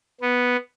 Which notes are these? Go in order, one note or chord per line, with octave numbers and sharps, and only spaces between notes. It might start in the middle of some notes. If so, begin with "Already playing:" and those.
B3